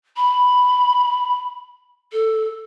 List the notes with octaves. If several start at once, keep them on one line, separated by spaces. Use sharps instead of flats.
B5
A4